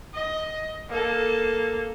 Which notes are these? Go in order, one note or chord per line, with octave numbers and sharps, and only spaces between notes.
D#5
A#3 A4